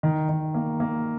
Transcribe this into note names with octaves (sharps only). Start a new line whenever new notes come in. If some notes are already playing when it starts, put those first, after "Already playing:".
D#3
D#3
A#3
A#3